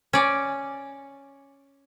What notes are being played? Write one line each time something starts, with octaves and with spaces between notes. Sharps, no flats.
C#4 D5